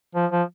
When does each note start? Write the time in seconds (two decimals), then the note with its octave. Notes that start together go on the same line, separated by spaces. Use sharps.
0.15 F3
0.32 F3